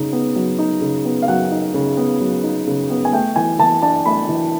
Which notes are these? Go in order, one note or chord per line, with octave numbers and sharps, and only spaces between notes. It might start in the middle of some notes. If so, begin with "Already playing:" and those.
Already playing: C#3 D#4
B3
F#3
D#4
C#3
B3
F5
F#3 F#5
D#4
C#3
B3
F#3
D#4
C#3
B3
G#5
A3 G5
E3 G#5
E3 A5
D4 A5
A3 B5
E3